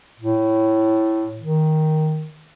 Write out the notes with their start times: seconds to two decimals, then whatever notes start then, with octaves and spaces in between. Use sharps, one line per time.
0.20 A2
1.40 D#3